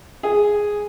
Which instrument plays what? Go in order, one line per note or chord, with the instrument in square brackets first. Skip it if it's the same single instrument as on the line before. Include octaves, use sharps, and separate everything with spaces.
[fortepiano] G#4